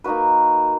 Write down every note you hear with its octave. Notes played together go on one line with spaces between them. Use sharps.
A#3 D#4 F#4 B4